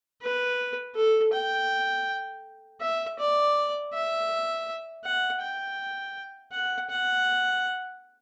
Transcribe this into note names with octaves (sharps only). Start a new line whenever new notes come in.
B4
A4
G5
E5
D5
E5
F#5
G5
F#5
F#5